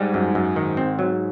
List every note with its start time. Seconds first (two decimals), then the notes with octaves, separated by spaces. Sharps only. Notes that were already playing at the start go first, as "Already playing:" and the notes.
Already playing: G#2 G3
0.14 F#2
0.35 F#2
0.56 D#3
0.77 C4
0.99 F#3